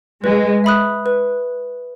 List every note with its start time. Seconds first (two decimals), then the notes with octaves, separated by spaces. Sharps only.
0.23 G#3 B4
0.64 E5 B5 D#6 F#6
1.06 B4